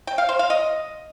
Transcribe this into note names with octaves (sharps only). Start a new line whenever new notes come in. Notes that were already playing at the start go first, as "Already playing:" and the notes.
G5
F5
C5
F5
D#5